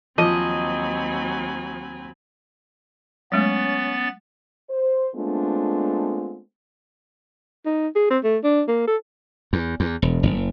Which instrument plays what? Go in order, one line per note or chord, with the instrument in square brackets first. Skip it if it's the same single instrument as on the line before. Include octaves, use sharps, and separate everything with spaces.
[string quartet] D#2 F#3 B5 [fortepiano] F3 [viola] C4 G#5 [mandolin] D#5
[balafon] F#3 G#3 A3 [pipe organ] B3 A6 [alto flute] C#4
[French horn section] C5
G#3 A3 B3 C4 D4 F4
[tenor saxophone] D#4
G#4
C4
A3
D4
A#3
A4
[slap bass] E2
E2
E1
F#1